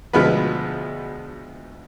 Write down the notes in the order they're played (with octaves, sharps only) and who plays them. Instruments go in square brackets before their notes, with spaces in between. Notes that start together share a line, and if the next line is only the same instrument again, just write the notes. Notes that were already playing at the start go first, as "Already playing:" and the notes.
[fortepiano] D2 B2 F3 G#3 B3 B4